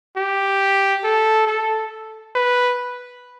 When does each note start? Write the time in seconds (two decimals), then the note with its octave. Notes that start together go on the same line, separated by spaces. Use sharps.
0.17 G4
1.04 A4
1.47 A4
2.36 B4